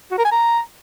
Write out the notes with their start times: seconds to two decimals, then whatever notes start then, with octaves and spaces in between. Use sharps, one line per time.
0.11 F#4
0.18 A#4
0.25 G#5
0.32 A#5